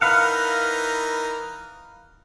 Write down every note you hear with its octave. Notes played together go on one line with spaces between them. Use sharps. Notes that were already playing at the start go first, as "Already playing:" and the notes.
E3 D#4 A#4 B4 F5 F#5